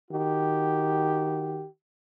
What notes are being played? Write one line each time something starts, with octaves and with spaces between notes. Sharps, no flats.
D#3 F#4 G4